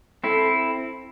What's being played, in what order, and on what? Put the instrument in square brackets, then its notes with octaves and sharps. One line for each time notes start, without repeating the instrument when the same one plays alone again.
[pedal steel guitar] C4 E4 [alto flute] A4